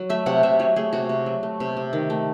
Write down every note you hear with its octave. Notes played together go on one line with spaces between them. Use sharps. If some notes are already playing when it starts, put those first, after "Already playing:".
Already playing: F#3
A3 E5
C3 F#5
C3 E5
F#3 C#5
A3 G#4
C3 F#4
C3
F#3
A3
C3
C3
D#3
A3